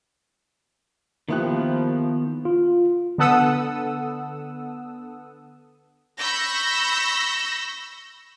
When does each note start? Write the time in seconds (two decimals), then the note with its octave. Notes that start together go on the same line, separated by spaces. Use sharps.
1.29 D#3 F3 A#3 B3 E4 G4 F#6
2.45 F4
3.18 D3 B3 A4 F#5 D#6 E6
6.18 B5 C#6 E6 G6 A#6